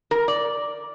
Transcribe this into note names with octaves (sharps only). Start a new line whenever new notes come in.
A#4
D5